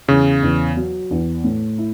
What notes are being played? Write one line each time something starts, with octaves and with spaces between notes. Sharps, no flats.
E2 C#3
E2
F#3
E2
A2
E4